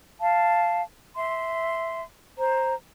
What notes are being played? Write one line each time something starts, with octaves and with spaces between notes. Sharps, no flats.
F5 A5
E5 C6
C5 A#5